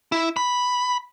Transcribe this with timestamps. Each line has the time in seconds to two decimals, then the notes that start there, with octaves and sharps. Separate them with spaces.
0.12 E4
0.37 B5